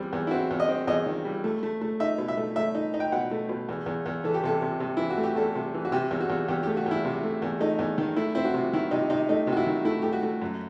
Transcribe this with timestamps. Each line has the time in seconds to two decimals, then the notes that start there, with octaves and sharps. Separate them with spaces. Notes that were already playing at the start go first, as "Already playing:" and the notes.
Already playing: E2 G3 C4
0.13 E2
0.27 E4
0.31 C4 F#4
0.51 E2
0.60 D#5
0.69 C4
0.87 E2 D#5
1.06 D#3
1.25 G3
1.44 A3
1.63 A3
1.81 A3
2.00 D#4 E5
2.18 B2
2.28 E5
2.37 A3
2.56 A3 E5
2.75 D#4
2.94 D#4
3.00 G5
3.12 B2 F#5
3.31 A3
3.49 B2
3.69 E2
3.86 E2
4.06 E2
4.24 E3 A4
4.34 G4
4.43 C3 A4
4.62 C3
4.80 C3
4.97 E3 E4
5.10 F#4
5.18 A3
5.24 G4
5.36 E2 A4
5.55 C3
5.74 E3
5.85 F#4
5.92 C3 G4
6.11 E2
6.20 F#4
6.30 E2
6.48 E2 G4
6.63 A3 G4
6.77 F#4
6.86 E2 E4
7.05 C3
7.24 A3
7.42 E2
7.60 A3 D#4
7.79 E2
7.98 D#3
8.16 A3 E4
8.35 C4 E4
8.45 F#4
8.54 C3
8.73 D#3 E4
8.91 C3 D#4
9.10 C3 D#4
9.29 A3 D#4
9.47 C3
9.52 F#4
9.57 E4
9.67 D#3
9.85 A3 E4
10.02 A3 G4
10.13 F#4
10.23 A3
10.42 F#2